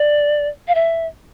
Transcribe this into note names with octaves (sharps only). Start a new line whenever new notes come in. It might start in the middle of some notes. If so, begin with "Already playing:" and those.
Already playing: D5
F5
E5